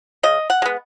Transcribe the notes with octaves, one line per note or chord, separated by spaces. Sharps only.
C#3 D#5
F#5
G#3 B3